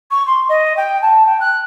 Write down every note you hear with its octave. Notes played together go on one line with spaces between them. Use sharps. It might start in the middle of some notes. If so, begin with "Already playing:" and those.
C#6
C6
D#5
G5
A5
G5
F#6